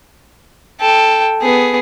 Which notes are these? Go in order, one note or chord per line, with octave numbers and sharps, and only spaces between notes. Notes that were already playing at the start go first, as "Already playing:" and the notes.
A4 G5
B3 G#4